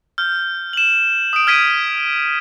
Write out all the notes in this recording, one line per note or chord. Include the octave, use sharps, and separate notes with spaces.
F6 G6
E7 F#7
D#6 D7
F6 G#6 B6 D7 D#7